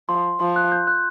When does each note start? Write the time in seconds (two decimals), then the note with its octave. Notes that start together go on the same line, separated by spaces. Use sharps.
0.09 F3 C6
0.40 F3 C6
0.56 F#6
0.72 G6
0.87 F#6